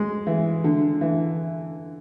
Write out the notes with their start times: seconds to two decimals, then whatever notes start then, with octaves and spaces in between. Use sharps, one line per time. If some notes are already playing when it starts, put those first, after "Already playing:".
Already playing: G#3
0.27 E3
0.64 D3
1.01 E3